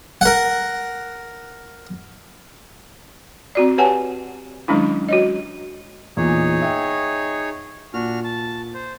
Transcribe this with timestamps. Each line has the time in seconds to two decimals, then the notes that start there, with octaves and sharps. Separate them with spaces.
0.21 A#4 F#5
3.55 C4 F#4 D5
3.78 G4 B4 C#5 F#5 G#5 A5
4.68 D#3 F#3 G#3 C#4 D4 E4
5.09 F#4 C#5 D#5
6.17 E2 A#2 D#4 G#4 C#5
6.62 E5 G5
7.94 A#2 D4 F#4 F6
8.24 A5
8.74 C5